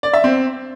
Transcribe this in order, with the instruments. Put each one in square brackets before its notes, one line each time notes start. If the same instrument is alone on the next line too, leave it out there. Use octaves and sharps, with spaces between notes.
[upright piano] D5
E5
C4